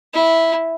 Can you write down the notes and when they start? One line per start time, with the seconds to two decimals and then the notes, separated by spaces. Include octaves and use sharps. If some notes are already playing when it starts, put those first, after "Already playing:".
0.14 E4